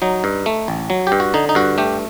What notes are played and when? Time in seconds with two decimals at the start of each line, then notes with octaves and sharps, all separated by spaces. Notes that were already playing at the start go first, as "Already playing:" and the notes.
0.02 F#3 D#4
0.24 G2
0.46 A3
0.68 A1
0.90 F#3
1.07 G4
1.12 G2
1.20 F#4
1.34 D3 D#4
1.49 D#4
1.55 G2 F#4
1.78 A3 G4